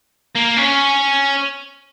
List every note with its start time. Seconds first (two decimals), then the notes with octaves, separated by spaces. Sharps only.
0.36 A#3
0.57 C#4